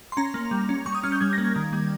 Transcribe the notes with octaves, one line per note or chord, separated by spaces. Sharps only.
C6
C#4 A#5
A#3
G3
C#4
G3 C#6
D#6
C#4 F6
G6
G3 G#6
A#3 A#6
G#6
D#3
G3